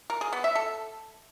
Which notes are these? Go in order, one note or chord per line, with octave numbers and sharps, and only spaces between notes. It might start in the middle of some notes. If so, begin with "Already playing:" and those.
A#4
G#4
B3
E5
A4